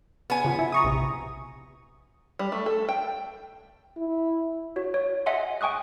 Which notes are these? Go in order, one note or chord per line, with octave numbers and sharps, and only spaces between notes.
B3 G#5
C#3 F3
E4
A#5 C#6 D#6
A#1 C3
G3
A3
A4
G5
E4
F#4 C#5
C#5
D#5 E5 F#5 G#5 C6
G5 G#5 C#6 D#6 F#6